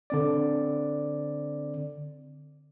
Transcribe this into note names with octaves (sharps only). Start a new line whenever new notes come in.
D3 C4 D5